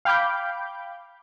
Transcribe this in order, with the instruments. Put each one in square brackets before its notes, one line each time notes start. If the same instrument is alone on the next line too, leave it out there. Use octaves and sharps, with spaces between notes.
[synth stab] F5 G5 B5 D6 G6